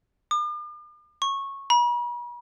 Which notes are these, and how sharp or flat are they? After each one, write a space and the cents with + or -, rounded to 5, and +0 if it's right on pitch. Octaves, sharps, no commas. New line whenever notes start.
D6 +45
C#6 -15
B5 -45